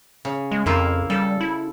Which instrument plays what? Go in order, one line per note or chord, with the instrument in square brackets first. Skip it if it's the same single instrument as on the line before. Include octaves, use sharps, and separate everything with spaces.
[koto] C#3
[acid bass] G#3
[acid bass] F2 [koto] A#3 E4 F4
[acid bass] G3 [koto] A4
[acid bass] E4